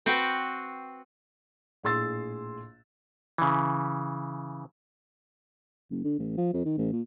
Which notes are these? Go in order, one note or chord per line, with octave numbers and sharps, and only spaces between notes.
C4 F#4 B4 G5
A#1 A2 G#4 C6 E6 A6
C#3 E3
F#1
D3
A1
F3
F2
D#3
A1
A#2